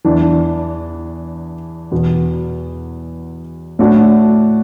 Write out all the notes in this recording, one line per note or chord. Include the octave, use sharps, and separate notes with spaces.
E2 E3 D4
E2 B2 B3
A2 A3 D4 F#4